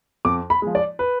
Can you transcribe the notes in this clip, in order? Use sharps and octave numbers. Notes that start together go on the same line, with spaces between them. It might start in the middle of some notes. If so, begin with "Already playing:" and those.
F2 D6
B5
F3 G#3
D5
B4